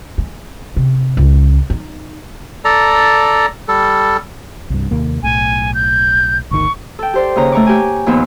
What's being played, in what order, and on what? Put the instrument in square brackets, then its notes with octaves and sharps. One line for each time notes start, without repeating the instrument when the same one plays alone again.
[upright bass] G#3
C3
C#2
D#4
[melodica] A4 D5 A#5
G3 A4
[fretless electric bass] C2 G2
D#2 C3 A#3
[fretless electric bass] B1 A2 [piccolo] G#5
[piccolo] G6
[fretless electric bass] G#1 D2 D#3 [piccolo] C#6
[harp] A4 G5
G4 C5 D5
D#2 C#3 A#5
A3 A#5 C#6 D6
G4 G#5
D#2 A#2 F3 B3 F4 E6